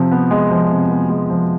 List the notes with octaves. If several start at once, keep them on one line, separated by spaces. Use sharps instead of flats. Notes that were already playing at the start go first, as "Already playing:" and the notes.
Already playing: C3 F3
B3
G#3
F3
C3
B3
G#3
F3